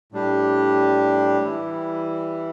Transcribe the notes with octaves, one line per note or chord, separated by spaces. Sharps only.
A2 G3 D4 G4
E3 G3 E4